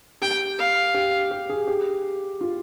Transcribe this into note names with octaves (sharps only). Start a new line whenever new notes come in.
G4 G5
F5
G4
G4
G#4
G4
F4